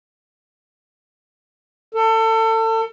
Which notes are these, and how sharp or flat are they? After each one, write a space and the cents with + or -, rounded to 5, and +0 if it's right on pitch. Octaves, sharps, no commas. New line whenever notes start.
A4 +30